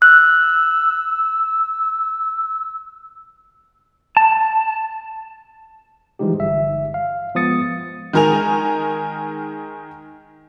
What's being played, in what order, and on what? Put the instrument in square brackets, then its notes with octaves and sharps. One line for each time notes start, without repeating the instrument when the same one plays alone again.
[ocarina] E6 [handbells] F#6
[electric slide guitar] A5
[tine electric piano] E3 F3 G3 G#3 D#4 G4
G1 E5
F5
F3 G#3 B3 D#6 A6 C#7
[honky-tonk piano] D#3 G#3 A#4 G#5 F7